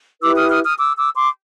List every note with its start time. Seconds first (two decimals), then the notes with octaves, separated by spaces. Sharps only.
0.22 E4 G4 B4 D6 E6
0.36 D#6 F6
0.50 D#6 F6
0.64 D#6 F6
0.78 D6 E6
0.96 D6 E6
1.15 C6 D6